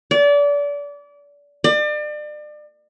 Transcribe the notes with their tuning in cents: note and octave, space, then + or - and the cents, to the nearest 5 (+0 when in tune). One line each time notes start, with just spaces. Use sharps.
D5 -30
D5 +35